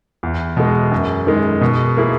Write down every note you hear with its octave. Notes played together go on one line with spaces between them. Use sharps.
E2
B2 G#3
F#2
D#3 G#3
B2
A#3 E4 G#4